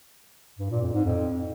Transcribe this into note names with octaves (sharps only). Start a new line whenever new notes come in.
G2
A#2
F2
G#2
F2